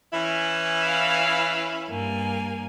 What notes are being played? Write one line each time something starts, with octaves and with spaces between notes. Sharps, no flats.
E3 C#4 E4
F5 B5
G2 A#3 G#5